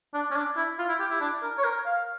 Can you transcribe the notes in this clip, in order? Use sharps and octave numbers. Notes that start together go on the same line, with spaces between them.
D4
C#4
D4
E4
F4
E4
G4
E4
D4
A#4
C#5
A#4
F5